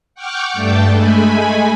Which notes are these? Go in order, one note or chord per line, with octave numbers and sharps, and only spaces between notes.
F#5 G5 C#6 D6 F6 G6
G2 A3 D4 G5 A5
G#3 A3 G#5 B5